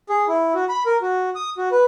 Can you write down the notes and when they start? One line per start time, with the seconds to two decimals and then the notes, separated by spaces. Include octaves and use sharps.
0.10 G#4
0.28 E4
0.55 F#4
0.69 B5
0.86 A#4
1.02 F#4
1.35 D#6
1.58 F#4
1.71 B4